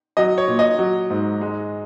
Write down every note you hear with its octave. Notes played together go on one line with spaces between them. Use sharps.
F#3 D#5
C#5
A#2
D#5
F#3
G#2
G#3